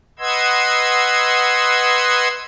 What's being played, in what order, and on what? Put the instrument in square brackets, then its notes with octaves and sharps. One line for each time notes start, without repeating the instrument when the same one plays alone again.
[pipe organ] B4 D#5 F#5 C6 E6 G#6